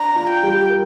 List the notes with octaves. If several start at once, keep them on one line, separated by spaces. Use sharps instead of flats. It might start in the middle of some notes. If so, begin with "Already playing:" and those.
Already playing: D4 A#5
F4
G5
G3
A#4